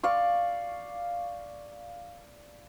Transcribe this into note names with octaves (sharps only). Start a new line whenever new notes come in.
D5 F5 C#6